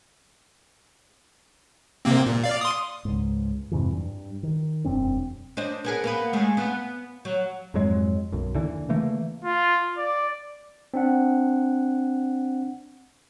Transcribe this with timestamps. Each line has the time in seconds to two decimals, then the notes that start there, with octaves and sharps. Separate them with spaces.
2.05 C3 A#3 C4
2.26 A#2
2.44 D5 F5
2.61 C6 D#6
3.05 C#2 G#2
3.71 F2 G#2 C3 E3
3.94 G2
4.43 D#3
4.84 E1 F#2 C4 D4
5.57 D4 C5 D#5
5.85 B3 G#4 A#4
6.04 A#3 B3 B4
6.33 G#3 A3
6.57 B3
7.25 F#3
7.74 F2 G#2 F#3 G#3
8.32 B1 F#2
8.55 D#2 D3 E3
8.89 C#3 E3 A3 A#3
9.45 F4
9.98 D5
10.94 C4 D4 F#5